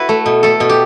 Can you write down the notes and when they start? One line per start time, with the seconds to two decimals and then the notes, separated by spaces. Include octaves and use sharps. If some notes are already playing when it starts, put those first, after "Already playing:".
Already playing: E4 F#4 B4
0.09 A3
0.26 B2
0.43 A3 A4
0.60 B2
0.69 G4